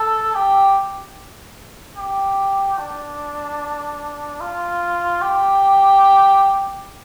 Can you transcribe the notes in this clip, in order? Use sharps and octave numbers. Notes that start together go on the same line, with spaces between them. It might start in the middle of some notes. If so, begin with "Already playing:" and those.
Already playing: A4
G4
G4
D4
F4
G4